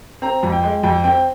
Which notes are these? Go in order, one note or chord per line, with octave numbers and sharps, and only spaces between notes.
C4 A#5
F2
G5
G#3
F2 G5
C4 G5